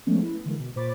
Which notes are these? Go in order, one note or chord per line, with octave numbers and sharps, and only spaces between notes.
F3 G#3 A3 B3 C#4
E4 B4
D3 E3 G#3 A#3
B2
A#2 C5 C#5 B5 D6 A6